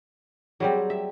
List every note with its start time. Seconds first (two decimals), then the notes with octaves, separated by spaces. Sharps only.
0.60 F#3 G3 C4 G#4 D5 F#5
0.90 E5